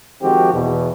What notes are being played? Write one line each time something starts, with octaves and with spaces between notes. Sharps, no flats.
D#3 F3 G#3 C4 F#4 G4
E2 B2